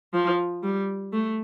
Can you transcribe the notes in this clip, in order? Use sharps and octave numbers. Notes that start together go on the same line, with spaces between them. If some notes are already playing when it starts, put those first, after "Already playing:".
F3
G3
A3